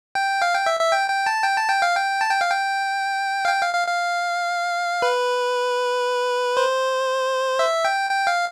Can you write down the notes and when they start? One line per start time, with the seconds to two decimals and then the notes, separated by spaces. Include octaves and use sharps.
0.15 G5
0.42 F5
0.54 G5
0.66 E5
0.80 E5
0.93 G5
1.10 G5
1.26 A5
1.44 G5
1.57 A5
1.70 G5
1.82 F5
1.95 G5
2.21 A5
2.31 G5
2.41 F5
2.51 G5
3.45 F5
3.49 G5
3.62 F5
3.74 F5
3.87 F5
5.02 B4
6.57 C5
7.59 E5
7.85 G5
8.10 G5
8.27 F5